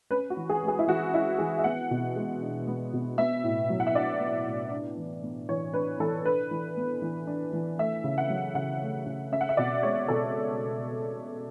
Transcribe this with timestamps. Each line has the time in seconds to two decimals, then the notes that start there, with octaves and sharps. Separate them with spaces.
0.11 C#4 B4
0.30 F#4
0.37 E3
0.49 G#4
0.63 G#3
0.68 G#4
0.79 E4
0.87 E3 F#4
1.13 C#4 E4
1.38 E3 G#4
1.58 E5
1.64 B3 F#5
1.91 B2
2.16 G#3
2.42 D4
2.67 B3
2.93 B2
3.18 B3 E5
3.44 A2
3.70 F#3
3.80 F#5
3.87 E5
3.95 D4 D5
4.20 B3
4.46 A2
4.71 D4
4.97 E3
5.23 B3
5.49 E3 C#5
5.73 D4 B4
6.00 E3 A4
6.25 D4 B4
6.51 E3
6.77 B3
7.02 E3
7.27 D4
7.53 E3
7.79 A3 E5
8.04 C#3
8.18 F#5
8.30 F#3
8.55 C#3 F#5
8.81 A3
9.07 C#3
9.32 C#4 E5
9.41 F#5
9.49 E5
9.57 B2 D5
9.83 G#3 C#5
10.08 B2 A4